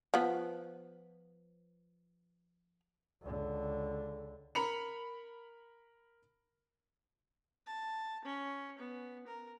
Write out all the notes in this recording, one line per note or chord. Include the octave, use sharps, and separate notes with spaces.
F3 B3
C#2 D3
A#4 B5 C#7 F7
A5
C#4
B3
A#4